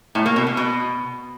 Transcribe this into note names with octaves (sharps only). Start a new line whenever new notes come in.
A2
A#3
B2
B2
B2